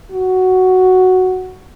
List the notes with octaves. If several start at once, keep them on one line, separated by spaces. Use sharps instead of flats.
F#4